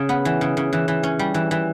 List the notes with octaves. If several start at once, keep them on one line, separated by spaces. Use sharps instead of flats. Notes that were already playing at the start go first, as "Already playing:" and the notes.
Already playing: C#3
B3
E3
C#3
C#3
E3
E3
C#4
G3
E3
E3